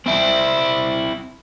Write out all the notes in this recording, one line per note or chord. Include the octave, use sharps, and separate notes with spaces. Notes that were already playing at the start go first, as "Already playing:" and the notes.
C4 E4